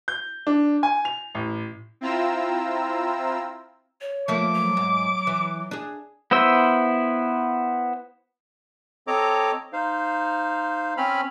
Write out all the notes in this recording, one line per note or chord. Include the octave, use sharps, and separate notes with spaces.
G6
D4
G#5
F7
A1
C4 E4 F4 A#5 E6
C#5
F3 A3 A#3 D6
F#3
G#2
E3
D4 G#4
B3 E4 C5 E6
C4 A4 C#5 D#5 A#5 D6
D#4 C5 F5
C4 C#4 B5 F6